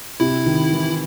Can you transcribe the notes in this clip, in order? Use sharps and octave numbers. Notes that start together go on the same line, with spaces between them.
C3 E4
D#3
E3